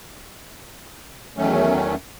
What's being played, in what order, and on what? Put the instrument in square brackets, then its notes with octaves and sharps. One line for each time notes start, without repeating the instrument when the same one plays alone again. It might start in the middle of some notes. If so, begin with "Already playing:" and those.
[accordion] E2 D#3 F#3 A3 C#4